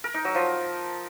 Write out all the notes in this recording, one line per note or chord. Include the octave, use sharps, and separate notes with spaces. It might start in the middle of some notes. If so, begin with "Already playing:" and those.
A#4
D#4
F#3
F3